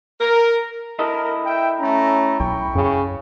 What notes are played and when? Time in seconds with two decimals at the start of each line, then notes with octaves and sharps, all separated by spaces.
0.20 A#4
0.99 E4 A4 A#4 D#5
1.45 E5 G5
1.80 A3 C#4 A#5
2.40 B1 G5 B5 C#6
2.75 F#2 C#3